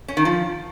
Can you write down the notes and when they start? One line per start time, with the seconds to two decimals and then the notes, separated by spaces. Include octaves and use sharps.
0.08 C#4
0.17 D#3
0.25 F3